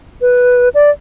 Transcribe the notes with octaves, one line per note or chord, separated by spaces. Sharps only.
B4
D5